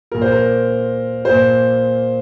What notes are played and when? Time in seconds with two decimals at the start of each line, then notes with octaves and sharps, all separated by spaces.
0.12 A#2 A#3 A#4
0.22 C5
0.32 A#4
1.25 A#2 A#3 C5